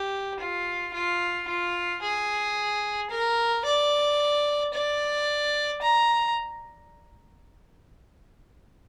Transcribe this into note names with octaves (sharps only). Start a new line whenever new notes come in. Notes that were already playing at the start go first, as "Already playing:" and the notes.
Already playing: G4
F4
F4
F4
G#4
A#4
D5
D5
A#5